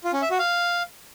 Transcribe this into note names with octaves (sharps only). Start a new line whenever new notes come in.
F4
C#4
E5
F#4
F5